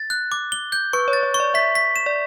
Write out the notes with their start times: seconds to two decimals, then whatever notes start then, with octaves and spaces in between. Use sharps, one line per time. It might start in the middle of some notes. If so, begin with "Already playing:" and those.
Already playing: A6
0.10 F#6
0.32 D6
0.52 G7
0.72 G6
0.93 B4 C#6
1.08 C#5
1.13 A6
1.23 C#5
1.34 C#6
1.40 D5
1.54 E5 B6
1.75 B6
1.96 E7
2.06 D5